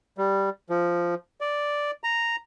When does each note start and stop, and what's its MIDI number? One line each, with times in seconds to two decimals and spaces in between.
0.18 0.50 55
0.70 1.15 53
1.41 1.91 74
2.04 2.36 82